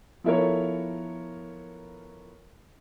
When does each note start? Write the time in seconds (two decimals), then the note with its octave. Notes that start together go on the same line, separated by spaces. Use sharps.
0.24 F3 B3 E4 A4 A#4 C#5